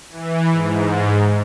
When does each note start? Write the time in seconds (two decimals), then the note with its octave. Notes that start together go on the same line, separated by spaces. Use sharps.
0.10 E3
0.51 G#2